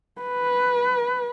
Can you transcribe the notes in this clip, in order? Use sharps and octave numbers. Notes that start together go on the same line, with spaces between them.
B4